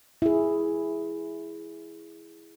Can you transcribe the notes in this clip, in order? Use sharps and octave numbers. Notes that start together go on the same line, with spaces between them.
E4 G#4